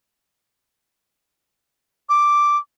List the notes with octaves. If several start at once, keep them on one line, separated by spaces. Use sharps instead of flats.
D6